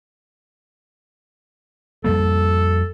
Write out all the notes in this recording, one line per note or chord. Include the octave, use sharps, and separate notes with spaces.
F2 G3 A#3 A4